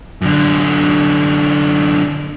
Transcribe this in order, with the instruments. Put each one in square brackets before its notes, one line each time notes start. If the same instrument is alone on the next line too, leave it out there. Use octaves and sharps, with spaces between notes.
[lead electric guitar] F#2 D3